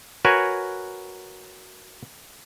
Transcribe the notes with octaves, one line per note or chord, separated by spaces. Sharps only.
F#4 A#4 B4 C#5 G#5